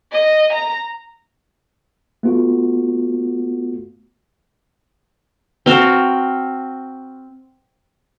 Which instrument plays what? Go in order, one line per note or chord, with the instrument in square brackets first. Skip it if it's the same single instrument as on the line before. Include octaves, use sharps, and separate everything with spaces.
[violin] D#5
A#5
[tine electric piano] A3 B3 F4 F#4
[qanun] C4 F#4 F5 A5